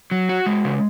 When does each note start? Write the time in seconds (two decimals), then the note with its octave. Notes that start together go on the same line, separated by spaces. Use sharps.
0.11 F#3
0.29 F#4
0.46 G#3
0.65 C#3